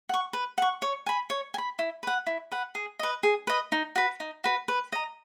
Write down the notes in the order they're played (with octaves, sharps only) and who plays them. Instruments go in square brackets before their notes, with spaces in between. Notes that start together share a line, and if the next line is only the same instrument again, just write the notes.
[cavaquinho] F#5 C#6
B4
F#5 C#6
C#5
G#5 B5
C#5
G#5
B5
E4
B4 F#5
E4
B4 F#5
G#4
B4 D#5
G#4
B4 D#5
D#4
F#4 B4
D#4
F#4 B4
B4
D#5 A#5